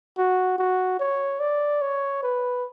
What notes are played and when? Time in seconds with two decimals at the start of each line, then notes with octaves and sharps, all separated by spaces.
0.18 F#4
0.58 F#4
0.99 C#5
1.40 D5
1.81 C#5
2.23 B4